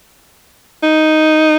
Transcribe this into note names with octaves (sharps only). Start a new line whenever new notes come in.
D#4